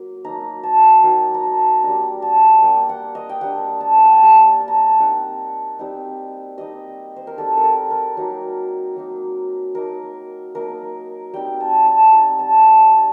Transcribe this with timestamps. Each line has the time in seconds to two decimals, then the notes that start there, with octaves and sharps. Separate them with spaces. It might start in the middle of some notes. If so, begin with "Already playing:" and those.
Already playing: F#3 A#3
0.25 F#3 A#3 D#4 A#5
0.63 A5
1.03 F#3 A#3 D#4 G5
1.34 A#5
1.43 A5
1.83 G3 A#3 D4 A#5
2.22 A5
2.62 G3 A#3 D4 G5
2.89 F#5
3.15 D#5
3.29 G5
3.41 G3 A#3 D4 F#5
3.81 A5
3.98 F#5
4.06 G5
4.13 A5
4.20 G3 A#3 D4 A#5
4.60 A5
4.68 A#5
4.75 A5
4.99 G3 C4 D#4 F#5
5.79 G3 C4 D#4
6.58 G3 C4 D#4 D#5
7.16 C5
7.27 A#4
7.37 G3 C4 D#4 A4
7.58 A#4
7.64 A4
7.91 A#4
8.17 F#3 A#3 D#4
8.96 F#3 A#3 D#4
9.75 F#3 A#3 D#4 A#4
10.55 F#3 A#3 D#4 A#4
11.33 G3 C4 D#4 G5
11.60 A5
11.86 A5
12.13 G3 C4 D#4 A#5
12.39 A5
12.66 A5
12.92 G3 C4 D#4